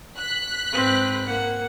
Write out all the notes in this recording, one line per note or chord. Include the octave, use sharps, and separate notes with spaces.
F#6 B6
G#2 C4 B4
A#3 F#5